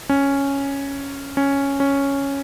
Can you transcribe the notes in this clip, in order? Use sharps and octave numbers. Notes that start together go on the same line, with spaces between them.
C#4
C#4
C#4